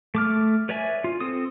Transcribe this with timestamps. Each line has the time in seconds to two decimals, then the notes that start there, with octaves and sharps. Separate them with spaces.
0.15 A3 D6 F6
0.69 B4 C#5 D5 E5 G#5
1.04 F4
1.20 C4 A4 D#6